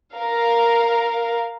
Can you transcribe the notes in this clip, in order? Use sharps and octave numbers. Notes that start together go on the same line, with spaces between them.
A#4 F5